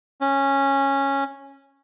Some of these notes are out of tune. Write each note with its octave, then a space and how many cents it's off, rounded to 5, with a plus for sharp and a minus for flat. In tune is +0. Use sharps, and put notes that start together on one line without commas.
C#4 -10